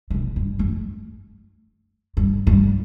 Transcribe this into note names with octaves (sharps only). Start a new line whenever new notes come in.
C3
B2
G2
F#2
G2
G2